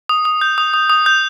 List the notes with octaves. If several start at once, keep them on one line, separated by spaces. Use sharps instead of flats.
D#6
D#6
G6
D#6
D#6
D#6
G6